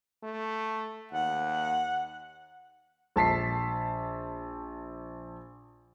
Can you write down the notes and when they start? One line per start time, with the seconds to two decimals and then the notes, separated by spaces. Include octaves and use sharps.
0.23 A3
1.12 D#2 F#5
3.16 A#1 A5 B6 C7